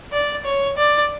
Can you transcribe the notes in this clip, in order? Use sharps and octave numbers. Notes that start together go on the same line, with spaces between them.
D5
C#5
D5